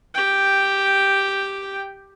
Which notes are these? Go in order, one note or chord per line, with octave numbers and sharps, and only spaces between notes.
G4 G5